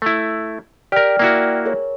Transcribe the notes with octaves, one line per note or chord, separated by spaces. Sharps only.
A3 E4
G4 A#4 D5 G5 F6
A#3 E4 F#4
G#4 A#4 C#5